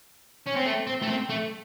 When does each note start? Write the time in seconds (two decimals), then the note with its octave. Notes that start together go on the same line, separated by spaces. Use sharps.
0.47 C#4
0.56 C4
0.66 A3
0.87 C4
1.02 A3
1.09 C4
1.30 A3